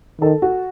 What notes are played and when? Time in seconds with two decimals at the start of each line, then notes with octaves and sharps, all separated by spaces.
0.21 D#3 A4
0.42 F#4